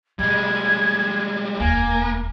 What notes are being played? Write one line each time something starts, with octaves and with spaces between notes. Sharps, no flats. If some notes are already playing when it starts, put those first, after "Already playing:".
B2 G3 G#3 D4 G#6
E1 D2 A#3 G#5